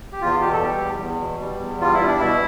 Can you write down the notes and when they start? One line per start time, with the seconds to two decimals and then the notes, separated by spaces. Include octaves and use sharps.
0.12 G4
0.22 E2 F4
0.41 B2 G4
0.53 A4
0.62 G3 G4
0.81 E2
1.01 E2
1.21 B2
1.41 G3
1.61 E2
1.81 G3 F4
1.93 E4
2.01 G3
2.07 D4
2.19 B2 E4